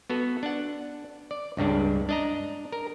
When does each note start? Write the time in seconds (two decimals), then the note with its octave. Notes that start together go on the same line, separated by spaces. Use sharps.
0.10 B3 F#4 A4
0.43 D4 F#5
1.31 D5
1.57 C#2 G2 C#3 D4
2.09 D4 D#5 A#5
2.72 A#4